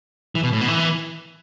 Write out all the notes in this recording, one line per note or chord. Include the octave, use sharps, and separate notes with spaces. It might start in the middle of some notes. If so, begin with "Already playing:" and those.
E3
B2
A2
B2
E3